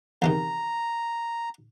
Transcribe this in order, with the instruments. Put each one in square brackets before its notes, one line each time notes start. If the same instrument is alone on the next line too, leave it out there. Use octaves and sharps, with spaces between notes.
[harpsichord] E2 C3 D#3 [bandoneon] A#5